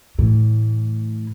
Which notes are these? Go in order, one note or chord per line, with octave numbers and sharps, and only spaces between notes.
A2 E3